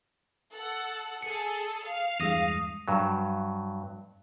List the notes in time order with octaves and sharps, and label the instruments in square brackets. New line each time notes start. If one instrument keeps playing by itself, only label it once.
[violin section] A4 F#5
[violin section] G#4 A4 [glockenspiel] C#7
[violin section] F5
[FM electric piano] E2 G2 G#3 [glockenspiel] D#6 A#6 D#7
[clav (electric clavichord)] G2 F#3